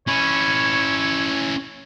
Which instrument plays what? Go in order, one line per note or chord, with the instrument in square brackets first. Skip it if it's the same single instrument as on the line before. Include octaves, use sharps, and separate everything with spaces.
[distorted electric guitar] C#4 E4 [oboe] C#5